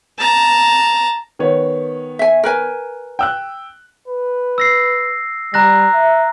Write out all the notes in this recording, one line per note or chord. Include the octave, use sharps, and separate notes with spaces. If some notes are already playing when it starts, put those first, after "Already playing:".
A5 A#5
D#3 B3 C#5
E5 G#5
A#4 B4 G#5
G5 E6 F#6
B4
E6 A#6 C7
G3 A#5 F#6 A#6
E5